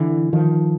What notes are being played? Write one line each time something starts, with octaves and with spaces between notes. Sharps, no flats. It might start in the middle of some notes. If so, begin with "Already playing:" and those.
Already playing: D3 E3
D#3 F3